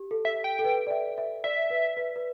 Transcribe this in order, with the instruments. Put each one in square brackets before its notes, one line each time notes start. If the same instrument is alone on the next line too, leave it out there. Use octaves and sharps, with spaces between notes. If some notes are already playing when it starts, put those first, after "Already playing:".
Already playing: [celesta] G4
A4
[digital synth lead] E5
G5
[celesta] A4
B4
D5
E5
E5
[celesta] D5 [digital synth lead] E5
[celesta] B4
B4
B4